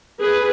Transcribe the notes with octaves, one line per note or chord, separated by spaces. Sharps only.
G#4 B4